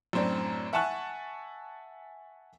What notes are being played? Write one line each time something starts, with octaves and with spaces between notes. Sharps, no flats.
F#2 A2 C4 D4
E5 F#5 G#5 A5 C#6 F#6